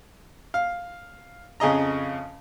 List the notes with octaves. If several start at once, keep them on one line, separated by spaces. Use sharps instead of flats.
F5
F2 C#3 G#4 D#5 A#5